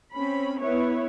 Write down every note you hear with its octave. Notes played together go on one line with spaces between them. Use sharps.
C4 C#4 B5
B3 E4 B4 C#5